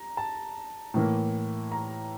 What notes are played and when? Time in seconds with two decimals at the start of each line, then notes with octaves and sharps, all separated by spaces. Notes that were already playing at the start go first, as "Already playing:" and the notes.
Already playing: A#5
0.17 A5
0.94 A2 E3 A#3
1.72 A#5